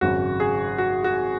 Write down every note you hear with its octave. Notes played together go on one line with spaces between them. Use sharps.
G#1 F#2 C#3 F#4
G#4
F#4
F#4